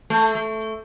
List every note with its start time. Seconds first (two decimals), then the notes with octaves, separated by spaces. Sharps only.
0.10 A3
0.35 A3